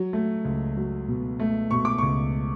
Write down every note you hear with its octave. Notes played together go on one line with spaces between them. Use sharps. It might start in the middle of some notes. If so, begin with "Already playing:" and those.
Already playing: F#3
A3
C#2
F#3
B2
A3
B2 C#6
D6
C#2 C#6